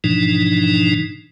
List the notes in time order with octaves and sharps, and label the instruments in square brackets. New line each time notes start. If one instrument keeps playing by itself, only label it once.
[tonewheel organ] G#2 B2 E3 F3 D4 D#4